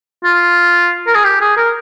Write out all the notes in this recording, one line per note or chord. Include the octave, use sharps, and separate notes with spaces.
F4
A#4
G#4
G4
G#4
A#4